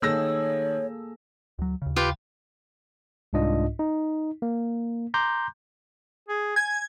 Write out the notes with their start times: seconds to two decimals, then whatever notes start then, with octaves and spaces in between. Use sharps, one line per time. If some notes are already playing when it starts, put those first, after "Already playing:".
0.02 D#3 A#3 G#4 A4 C#5 E6 A#6
1.59 D2 F#3
1.82 D#2 C#3
1.96 F4 G4 B4
3.33 C2 G#2 D4 F4 D#5
3.79 D#4
4.42 A#3
5.14 A#5 C6 D6 G6
6.29 G#4
6.56 G#5 G#6